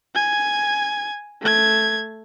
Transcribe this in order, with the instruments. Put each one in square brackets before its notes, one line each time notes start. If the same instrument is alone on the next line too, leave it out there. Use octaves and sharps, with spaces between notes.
[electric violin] G#5 G#6
A3 G#6